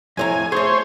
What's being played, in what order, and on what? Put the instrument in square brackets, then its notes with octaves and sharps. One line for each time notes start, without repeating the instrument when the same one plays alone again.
[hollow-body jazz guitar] F2 A2 A#5 [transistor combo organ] G#5
[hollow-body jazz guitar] A3 G#4 [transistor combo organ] C5 C#5